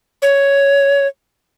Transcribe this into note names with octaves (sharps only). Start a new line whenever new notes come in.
C#5